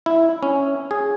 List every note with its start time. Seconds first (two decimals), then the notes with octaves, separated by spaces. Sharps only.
0.06 E4
0.43 C#4
0.91 G#4